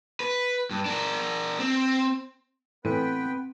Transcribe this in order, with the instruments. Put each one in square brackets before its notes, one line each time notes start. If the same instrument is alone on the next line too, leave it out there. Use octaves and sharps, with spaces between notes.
[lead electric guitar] B4
G2
D4 A#4
C4
[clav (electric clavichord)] A2 E3 [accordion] B3 B4 G5 [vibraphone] C4